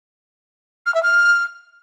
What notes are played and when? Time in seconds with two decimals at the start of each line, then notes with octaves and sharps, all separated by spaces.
0.86 F6
0.94 E5
1.03 F6